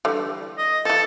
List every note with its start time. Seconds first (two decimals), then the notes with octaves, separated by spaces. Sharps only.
0.05 D3 E3 G3
0.58 D#5
0.85 E3 F3 A4